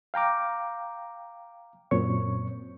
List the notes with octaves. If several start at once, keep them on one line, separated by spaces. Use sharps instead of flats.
F5 G5 A#5 D6
F#2 A#2 C4 C#5 C#6